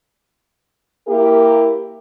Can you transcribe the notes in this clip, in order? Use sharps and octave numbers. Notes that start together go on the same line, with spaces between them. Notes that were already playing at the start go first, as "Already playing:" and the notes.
A#3 E4 G4 A#4